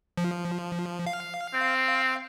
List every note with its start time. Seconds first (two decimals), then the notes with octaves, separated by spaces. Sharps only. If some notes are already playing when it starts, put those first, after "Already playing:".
0.18 F3
1.07 F5
1.54 C4